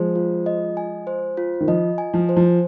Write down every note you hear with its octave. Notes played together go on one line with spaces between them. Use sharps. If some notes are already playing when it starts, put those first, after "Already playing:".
Already playing: F3 G#3 C5
F4
D#5
G#5
C5
F4
D#3
F3 D#5
G#5
F3
C5
F3